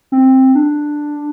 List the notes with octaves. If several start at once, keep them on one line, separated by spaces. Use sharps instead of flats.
C4
D4